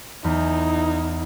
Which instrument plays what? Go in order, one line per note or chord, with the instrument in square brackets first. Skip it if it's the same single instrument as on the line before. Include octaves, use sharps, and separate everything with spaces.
[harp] E2 [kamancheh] D#4 E4